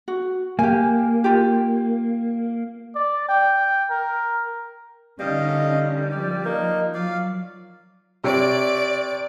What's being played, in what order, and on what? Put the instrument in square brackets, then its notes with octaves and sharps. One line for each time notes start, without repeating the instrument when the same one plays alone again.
[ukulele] F#4
[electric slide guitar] A#3 [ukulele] G4 G#5
[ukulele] F4 G4
[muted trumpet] D5
G5
A#4
[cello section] D3 C#4 D#4 [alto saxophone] G3 [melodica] D#5 F5
[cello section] F3 [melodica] D5
[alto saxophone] A#3 [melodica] D#4
[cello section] F#3 [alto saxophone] F4 [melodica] D5 F5
[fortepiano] C3 C#5 [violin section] D5 D7